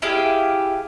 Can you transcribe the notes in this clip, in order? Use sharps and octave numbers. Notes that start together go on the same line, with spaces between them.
E4 G4 G#4 F5